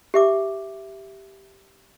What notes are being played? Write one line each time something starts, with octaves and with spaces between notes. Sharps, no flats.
G4 E5 D6